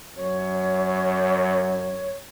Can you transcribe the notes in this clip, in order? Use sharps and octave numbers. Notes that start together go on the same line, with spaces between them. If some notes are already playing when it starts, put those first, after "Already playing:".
F#2 C#5